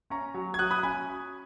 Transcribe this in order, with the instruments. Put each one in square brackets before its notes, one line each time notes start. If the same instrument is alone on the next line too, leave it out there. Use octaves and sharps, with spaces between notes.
[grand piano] C#4 A#5 C#6
F#3
G#6
F#3 D#6 F#6
B5 D#6
C#4 G#5 B5